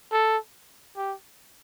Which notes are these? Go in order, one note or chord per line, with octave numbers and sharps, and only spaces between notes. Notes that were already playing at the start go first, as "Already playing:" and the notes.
A4
G4